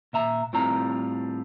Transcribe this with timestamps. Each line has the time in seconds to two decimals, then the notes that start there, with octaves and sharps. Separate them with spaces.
0.13 A#2 E5 A#5
0.53 A2 G3 C4 F4 A#5